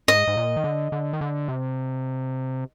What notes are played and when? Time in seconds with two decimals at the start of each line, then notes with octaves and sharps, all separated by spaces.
0.08 G#2 D#5
0.27 G#2
0.37 A#2
0.57 D#3
0.64 D3
0.92 D3
1.13 D#3
1.21 D3
1.48 C3